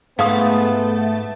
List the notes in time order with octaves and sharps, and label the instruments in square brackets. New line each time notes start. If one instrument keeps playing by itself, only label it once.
[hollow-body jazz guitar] G#2 [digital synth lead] A3 [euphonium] B3 [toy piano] F5 D#6